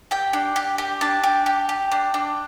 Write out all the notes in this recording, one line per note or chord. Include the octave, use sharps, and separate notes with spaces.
G4 G5
D4
G4
G4
D4 A5
G4
G4
G4
D4
D4